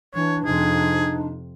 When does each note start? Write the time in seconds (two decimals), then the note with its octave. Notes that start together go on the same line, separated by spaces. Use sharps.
0.14 E3 D4 C#5
0.46 F2 C3 D#4 G#4